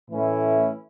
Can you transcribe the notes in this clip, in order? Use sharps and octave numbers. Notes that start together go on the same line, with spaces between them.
A2 E3 A3 C#4 E4